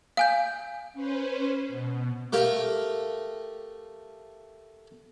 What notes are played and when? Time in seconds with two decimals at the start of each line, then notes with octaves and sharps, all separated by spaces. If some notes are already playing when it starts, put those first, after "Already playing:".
0.17 F5 G#5 G6
0.94 C#4 B4 C5
1.69 B2
2.33 A3 G4 A#4 F5 G5